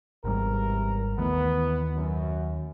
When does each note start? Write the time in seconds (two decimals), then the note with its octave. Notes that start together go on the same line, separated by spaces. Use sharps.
0.24 G#1 E2 G#2 C3 G3 A#4
1.18 D#2 D#3 E3 A3 B3
1.96 F#2